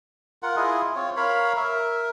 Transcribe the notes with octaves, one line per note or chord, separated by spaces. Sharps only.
F4 A#4 F#5
E4 F4 G#4 D#5
C4 F4 C#5
A#4 C#5 F5 B5
A#4 E5